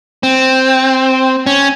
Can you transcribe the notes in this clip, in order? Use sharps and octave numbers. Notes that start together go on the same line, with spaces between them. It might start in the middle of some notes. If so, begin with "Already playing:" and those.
C4
C#4